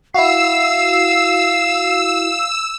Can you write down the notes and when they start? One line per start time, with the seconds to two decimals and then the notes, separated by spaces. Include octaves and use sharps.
0.14 E4 F#4 F5 E6 C7